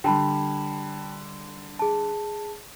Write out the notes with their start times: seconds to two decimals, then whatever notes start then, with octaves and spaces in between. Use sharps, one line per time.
0.04 D3 G3 G5 A5 B5
1.79 G#4 A5